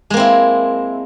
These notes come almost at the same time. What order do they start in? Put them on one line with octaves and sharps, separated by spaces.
G#3 A#3 C4 E4